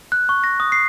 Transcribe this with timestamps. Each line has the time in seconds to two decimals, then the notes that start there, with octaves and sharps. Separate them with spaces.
0.12 F#6
0.29 C#6
0.44 A#6
0.60 D#6
0.72 C7